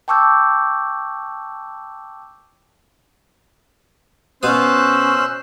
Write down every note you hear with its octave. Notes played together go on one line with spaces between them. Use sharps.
G5 A5 C#6 D6 E6 G6
B2 C#4 C5 F5 D#6 E6 F#6